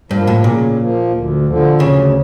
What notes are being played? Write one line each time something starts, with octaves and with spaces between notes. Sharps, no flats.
G2 F3 A#3
A2
A#2 C#3
F3 A#3
D2
D3 F3
D2 C#3